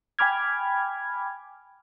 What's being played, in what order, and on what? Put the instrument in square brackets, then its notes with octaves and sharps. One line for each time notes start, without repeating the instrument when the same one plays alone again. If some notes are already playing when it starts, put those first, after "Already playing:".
[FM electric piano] G5 G#5 B5 D6 F6 G#6